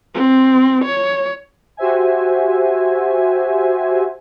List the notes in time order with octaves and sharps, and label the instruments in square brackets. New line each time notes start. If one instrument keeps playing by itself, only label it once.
[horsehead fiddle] C4
C#5
[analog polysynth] F#4 G4 C5 E5 G#5